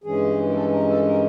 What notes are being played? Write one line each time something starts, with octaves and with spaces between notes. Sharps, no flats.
G2 E3 G#3 C#4 G#4
A#4
A4
A#4
A4
A#4